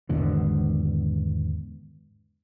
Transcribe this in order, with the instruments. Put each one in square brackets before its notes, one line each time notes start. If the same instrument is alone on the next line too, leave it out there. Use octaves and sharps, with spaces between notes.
[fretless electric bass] G#1 E2 B2 D3